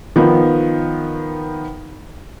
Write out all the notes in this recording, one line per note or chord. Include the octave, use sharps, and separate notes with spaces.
D#3 F3 B3